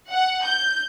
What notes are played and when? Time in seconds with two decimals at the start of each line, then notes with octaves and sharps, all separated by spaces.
0.11 F#5
0.44 G6